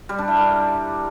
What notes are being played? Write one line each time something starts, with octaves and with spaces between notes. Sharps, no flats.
G3
D4
E4
A#4